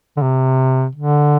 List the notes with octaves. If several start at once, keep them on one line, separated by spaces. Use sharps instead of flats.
D3
C3
D3